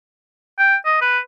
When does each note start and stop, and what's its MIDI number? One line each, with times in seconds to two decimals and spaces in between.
0.59 0.76 79
0.86 0.99 75
1.01 1.19 71